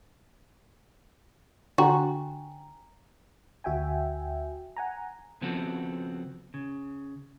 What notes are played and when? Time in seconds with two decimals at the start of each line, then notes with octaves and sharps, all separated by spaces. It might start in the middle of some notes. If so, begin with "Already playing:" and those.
1.78 D3 D4 F#4 G5 G#5 A#5
3.64 D2 F#4 E5 G5 G#5
4.77 F#5 G#5 A#5
5.41 C#3 F3 B3 C4 F#4 A4
6.54 C#3